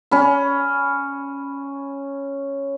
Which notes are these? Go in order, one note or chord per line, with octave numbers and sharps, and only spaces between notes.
C#4 B5